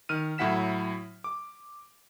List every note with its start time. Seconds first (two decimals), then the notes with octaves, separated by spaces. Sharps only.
0.09 D#3 F6 D#7
0.38 A2 F#3 E4 F#5 B6 E7
1.24 D6